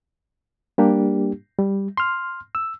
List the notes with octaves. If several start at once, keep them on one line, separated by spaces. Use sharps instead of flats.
G3 A#3 D4 G4
G3
C6 F6
E6